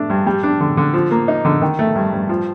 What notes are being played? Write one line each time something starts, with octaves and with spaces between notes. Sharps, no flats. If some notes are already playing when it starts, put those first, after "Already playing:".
Already playing: A3 D4
G2
G3
D4
D3
D3
F3
A#3
D#4
D3
D#3
A3
G2
G2
F3